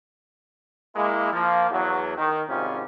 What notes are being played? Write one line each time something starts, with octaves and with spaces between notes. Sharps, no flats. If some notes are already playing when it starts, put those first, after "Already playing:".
G#3 A#3 E4
F3 A#3
E2 F#3
D#3
G#1 G#2 C3 G3 C#4 F4